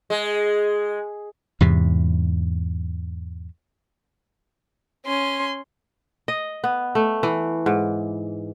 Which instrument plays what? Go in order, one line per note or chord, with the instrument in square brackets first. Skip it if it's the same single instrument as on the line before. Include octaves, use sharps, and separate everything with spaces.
[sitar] G#3
[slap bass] E2 G#2 C3
[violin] C#4 C6
[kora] D#5
B3
A3
E3
G#2